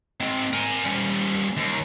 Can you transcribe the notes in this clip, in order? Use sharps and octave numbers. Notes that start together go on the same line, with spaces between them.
G#3 C4
A#4 G#5
G3 C#4
D#2